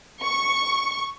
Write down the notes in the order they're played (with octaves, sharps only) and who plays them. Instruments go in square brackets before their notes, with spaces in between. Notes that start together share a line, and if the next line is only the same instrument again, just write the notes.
[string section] C#6